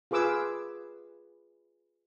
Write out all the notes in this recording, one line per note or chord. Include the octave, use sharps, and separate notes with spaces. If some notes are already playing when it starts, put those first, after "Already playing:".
F4 G#4 B4 D6 E6